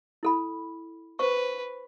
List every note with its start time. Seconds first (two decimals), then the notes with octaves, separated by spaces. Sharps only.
0.23 E4 A4 B5
1.19 B4 C5 C#6